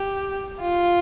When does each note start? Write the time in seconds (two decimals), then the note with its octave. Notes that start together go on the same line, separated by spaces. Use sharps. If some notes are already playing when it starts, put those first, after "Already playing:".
Already playing: G4
0.60 F4